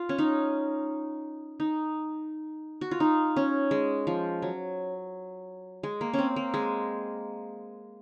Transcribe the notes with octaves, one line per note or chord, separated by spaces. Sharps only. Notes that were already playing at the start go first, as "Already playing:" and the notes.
Already playing: F4
C#4
D#4
D#4
F#4
F4
D#4
C#4
G#3
F3
F#3
G#3
A#3
C#4
C4
A#3
G#3